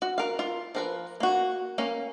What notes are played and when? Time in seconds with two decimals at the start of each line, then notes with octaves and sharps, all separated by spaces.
0.02 F#4
0.18 A#4 F5
0.39 F4
0.75 F3 A#4 B4
1.20 A#3 F#4
1.78 A#3 C#4